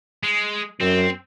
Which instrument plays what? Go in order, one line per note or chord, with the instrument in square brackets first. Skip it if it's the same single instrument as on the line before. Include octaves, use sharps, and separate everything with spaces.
[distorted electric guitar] G#3
[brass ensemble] F#2 [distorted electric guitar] C4